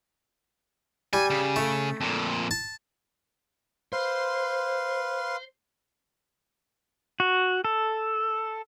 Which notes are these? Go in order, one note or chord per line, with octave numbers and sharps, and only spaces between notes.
G3 G#5
C#3
A3
F2 A#2
A5
B4 C5 F5 C6
F#4
A4